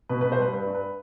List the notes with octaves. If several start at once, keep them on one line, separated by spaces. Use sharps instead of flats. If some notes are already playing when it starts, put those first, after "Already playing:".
B2 B4
B4
B2
C5
G3 B4
G2 B4
G2
B4